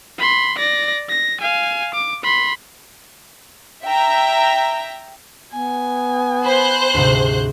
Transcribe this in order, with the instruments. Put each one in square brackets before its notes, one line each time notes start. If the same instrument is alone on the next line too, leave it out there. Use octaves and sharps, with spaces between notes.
[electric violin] B5 C6
D5 A#6
A#6
F5 G#5
D6
B5 C6
[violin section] E5 G5 A#5
[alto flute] B3 [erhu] G#5
[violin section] C5 F#6 G6 [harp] B5
[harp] D2 G#2 C3